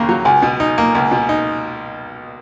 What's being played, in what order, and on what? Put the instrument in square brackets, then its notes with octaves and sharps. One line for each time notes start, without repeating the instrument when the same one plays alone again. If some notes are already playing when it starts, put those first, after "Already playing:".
Already playing: [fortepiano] D#2 C#3 A#3
F#3
[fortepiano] C#2 [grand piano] G#5
[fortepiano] B2
D#4
A#3
C#2
B2
D#4